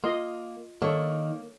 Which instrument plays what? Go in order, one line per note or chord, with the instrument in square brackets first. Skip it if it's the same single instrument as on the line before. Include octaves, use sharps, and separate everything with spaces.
[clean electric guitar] A#3 [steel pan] F4 D#5 C6
[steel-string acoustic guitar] D#3 [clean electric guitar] A#3 [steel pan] D4 A4 C#5